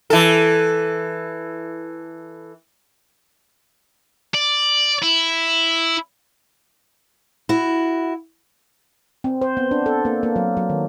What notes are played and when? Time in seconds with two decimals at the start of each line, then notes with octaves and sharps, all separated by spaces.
0.10 E3 A4
4.34 D5
5.02 E4
7.49 E4 F#4
9.24 C4
9.42 C5
9.57 B3
9.71 D4
9.86 A4
10.05 A#3
10.23 A#3
10.36 F#3
10.57 F#3
10.70 D#3